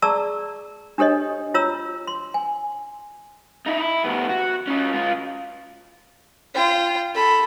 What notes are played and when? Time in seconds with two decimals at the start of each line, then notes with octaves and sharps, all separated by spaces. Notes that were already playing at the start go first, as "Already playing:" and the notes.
0.02 G#4 D5 A5 A#5 C#6 E6
0.98 D4 G4 A4 C#5 D#5
1.54 F4 C#5 A#5 E6
2.07 C6
2.34 G#5
3.66 D#4 E5
3.79 E4
4.05 D2 B3
4.30 F#4
4.68 C#4 F4
4.94 G#3 F4
6.54 F4 G5
7.15 A4 B5